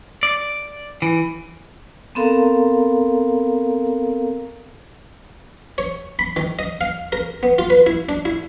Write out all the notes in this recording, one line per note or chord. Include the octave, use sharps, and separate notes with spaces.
D5
E3
B3 C4 A4 A#4 F5 A#5
C#5
B5
D#3
D#5
F5
A#4
B3
F4
B4
E4
D4
E4